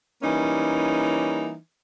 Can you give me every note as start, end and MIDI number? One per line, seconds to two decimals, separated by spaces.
0.23 1.54 52
0.23 1.54 55
0.23 1.54 58
0.23 1.54 61
0.23 1.54 63